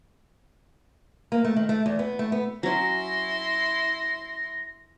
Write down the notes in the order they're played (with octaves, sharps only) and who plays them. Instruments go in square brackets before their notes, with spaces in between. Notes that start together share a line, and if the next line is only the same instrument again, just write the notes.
[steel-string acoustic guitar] A#3
A3
D#3
A3
E2
B3
A3
B3
[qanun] F#3 C#4 [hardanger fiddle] E4 C6 [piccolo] A#6